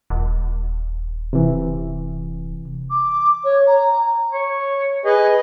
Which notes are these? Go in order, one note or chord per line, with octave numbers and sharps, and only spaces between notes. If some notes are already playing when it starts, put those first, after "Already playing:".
D#1
C3 E3
D6
C#5
A#5
C#5
G#4 B4 D#5